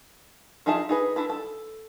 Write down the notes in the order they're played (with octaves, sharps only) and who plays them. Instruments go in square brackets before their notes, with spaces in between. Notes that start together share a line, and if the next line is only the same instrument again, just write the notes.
[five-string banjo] F3 D#4 G#4 E5 A5
D#4 G#4 B4
D4 E4 A4 B4
A4